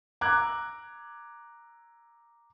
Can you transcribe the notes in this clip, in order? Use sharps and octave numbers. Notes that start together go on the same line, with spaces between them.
A#5 D6 E6 F#6 G#6